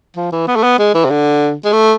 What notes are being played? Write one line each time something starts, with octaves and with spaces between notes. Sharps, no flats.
F3
E3
B3
A3
B3
G#3
E3
C3
D3
G#3
A3